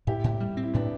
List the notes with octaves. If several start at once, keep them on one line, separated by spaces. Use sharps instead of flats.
A2 E4 G4
A2
G3
C4
E4
A2 B3 D4